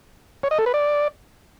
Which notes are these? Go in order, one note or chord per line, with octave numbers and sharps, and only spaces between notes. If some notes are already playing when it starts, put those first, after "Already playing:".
C#5
D#5
A4
B4
D5